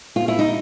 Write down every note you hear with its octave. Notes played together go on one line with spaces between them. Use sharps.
F4
E4
D#4